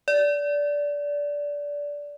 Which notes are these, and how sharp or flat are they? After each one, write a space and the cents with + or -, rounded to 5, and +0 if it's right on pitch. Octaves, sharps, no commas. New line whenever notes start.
D5 -15